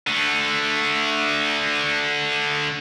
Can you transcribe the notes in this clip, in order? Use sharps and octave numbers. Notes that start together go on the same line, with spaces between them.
D3 A3